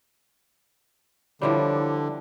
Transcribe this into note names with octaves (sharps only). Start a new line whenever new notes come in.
D3 E3 F3 G3 C#5 B5 D6